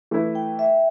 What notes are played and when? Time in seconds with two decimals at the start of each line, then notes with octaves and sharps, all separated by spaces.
0.11 E3 A3 E4 B4
0.35 G5
0.59 E5